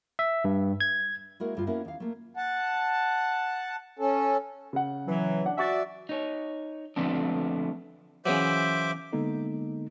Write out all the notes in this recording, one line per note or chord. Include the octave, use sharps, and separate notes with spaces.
E5
G2
G#6
G#3 A#3 E4 F#4 A#4
D2 G2 F4
A#3 B3 C#4 E4 F#4 A#4
D#2 F5
A3 A#3
F#5 A5
C#4 A4
C#3 F#5
E3 F#3
D4 F#5
F#4 D5 E5 G#5 C#6 A6
D#4 C#5
D3 F3 A3 B3 C4 D4
C#3 E3 F#3 C5 E5 D6
D3 G#3 A#3 B3 D#4 A4